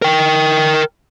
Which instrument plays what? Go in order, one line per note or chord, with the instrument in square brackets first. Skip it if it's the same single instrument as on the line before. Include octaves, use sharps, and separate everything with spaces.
[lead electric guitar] A#4 G5